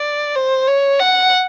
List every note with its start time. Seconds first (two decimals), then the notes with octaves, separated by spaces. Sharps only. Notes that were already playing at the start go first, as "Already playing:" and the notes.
Already playing: D5
0.36 C5
0.67 C#5
0.99 F#5